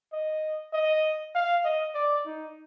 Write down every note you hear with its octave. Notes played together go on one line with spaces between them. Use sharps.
D#5
D#5
F5
D#5
D5
D#4